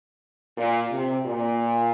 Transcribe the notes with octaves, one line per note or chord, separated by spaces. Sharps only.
A#2
C3
A#2